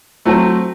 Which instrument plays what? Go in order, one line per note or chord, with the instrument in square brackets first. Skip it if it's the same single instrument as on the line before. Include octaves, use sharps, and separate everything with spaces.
[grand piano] F#3 A3 C4